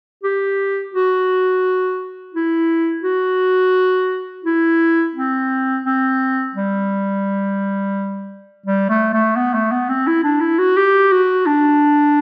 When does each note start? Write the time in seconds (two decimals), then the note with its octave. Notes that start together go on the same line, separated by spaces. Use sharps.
0.24 G4
0.94 F#4
2.34 E4
3.04 F#4
4.44 E4
5.16 C4
5.85 C4
6.55 G3
8.66 G3
8.89 A3
9.13 A3
9.36 B3
9.54 A3
9.72 B3
9.89 C4
10.07 E4
10.24 D4
10.41 E4
10.58 F#4
10.77 G4
11.12 F#4
11.47 D4